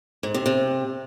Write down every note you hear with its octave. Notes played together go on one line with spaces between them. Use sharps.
G#2
C3
C3